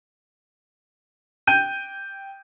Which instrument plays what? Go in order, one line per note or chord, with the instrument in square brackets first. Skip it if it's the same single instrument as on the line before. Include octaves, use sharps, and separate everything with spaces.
[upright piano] G5 G6 D#7